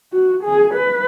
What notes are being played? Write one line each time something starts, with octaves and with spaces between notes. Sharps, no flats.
F#4
G#4
B4